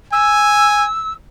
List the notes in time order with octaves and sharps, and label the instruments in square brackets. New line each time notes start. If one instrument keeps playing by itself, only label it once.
[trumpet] G#5 [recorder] E6